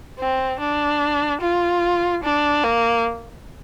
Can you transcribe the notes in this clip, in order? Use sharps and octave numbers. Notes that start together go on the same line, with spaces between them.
C4
D4
F4
D4
A#3